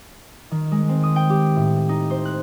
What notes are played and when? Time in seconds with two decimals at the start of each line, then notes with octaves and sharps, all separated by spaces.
0.51 D#3
0.71 G#3
0.89 C4
1.03 D#6
1.16 G5
1.30 G4
1.56 A2
1.89 D#4
2.10 C5
2.25 F#6